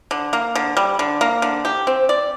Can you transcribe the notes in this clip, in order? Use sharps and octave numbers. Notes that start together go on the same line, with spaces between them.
D3
A#3
D3
G3
D3
A#3
D3
G4
C4
D5